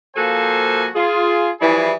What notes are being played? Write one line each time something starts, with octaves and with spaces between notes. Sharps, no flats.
F3 A#3 F#4 A4 C5 G#5
F4 G#4
E3 F3 G3 E4 G#4